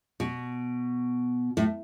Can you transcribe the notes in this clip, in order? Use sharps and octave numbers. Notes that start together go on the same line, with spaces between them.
B2
A2